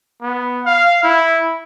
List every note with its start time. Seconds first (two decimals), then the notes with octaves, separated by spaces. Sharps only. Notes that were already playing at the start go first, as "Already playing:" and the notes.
0.22 B3
0.66 F5
1.03 E4